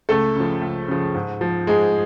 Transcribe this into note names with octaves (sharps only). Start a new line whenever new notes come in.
C#2 A3 A4
C#3 F3
C#2
C#3 F3
G#2
F3
G#2 G#3 G#4